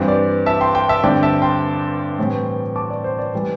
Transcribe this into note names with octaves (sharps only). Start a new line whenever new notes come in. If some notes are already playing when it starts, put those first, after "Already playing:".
Already playing: G2 E3 G3 C4
D5
E5 A5
G5 C6
G5 C6
E5 A5
G2 D3 C4 D5 G5
E5 A5
G5 C6
A2 E3 G3 C4
A5 D6
D5
C5
D5
E3 G3